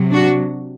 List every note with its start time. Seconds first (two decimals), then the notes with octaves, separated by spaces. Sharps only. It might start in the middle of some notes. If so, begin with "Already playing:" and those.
Already playing: C3 F#3
0.12 D4 F#4